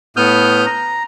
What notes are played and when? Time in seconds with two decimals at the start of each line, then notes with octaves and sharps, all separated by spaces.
0.17 A2 B3 D#6 F6 G6
0.66 A#5